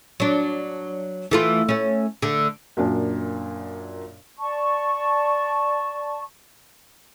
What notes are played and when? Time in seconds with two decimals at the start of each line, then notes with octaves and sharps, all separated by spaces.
0.20 F#3 D4
1.31 E3 A3 F4
1.69 A3 C#4
2.22 D3 A3
2.77 F#2 A#2 D4
4.38 D5 A5 C#6